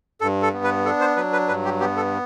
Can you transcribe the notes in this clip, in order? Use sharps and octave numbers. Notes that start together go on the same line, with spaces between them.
G2 A4
A4
B3
B4
D4 A4
C5
F#3 B4
B4
G2 B4
G4
B3 G4
A4